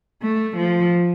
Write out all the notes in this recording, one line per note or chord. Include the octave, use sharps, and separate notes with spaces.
A3
F3